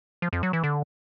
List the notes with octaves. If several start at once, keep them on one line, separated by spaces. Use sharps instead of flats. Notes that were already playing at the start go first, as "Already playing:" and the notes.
F3
F2
F#3
E3
D3